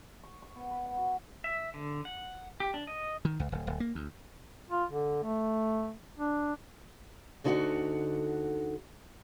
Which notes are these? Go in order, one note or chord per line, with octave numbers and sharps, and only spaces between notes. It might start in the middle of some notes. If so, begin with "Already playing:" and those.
C#6
C#6
B3
B4
F#5
F#4
E5
D3
F#5
G4
D4
D#5
D#3
C#2
D1
D1
A#3
D2
F4
D3
A3
D4
D2 D3 D#4 F#4 C5 F#5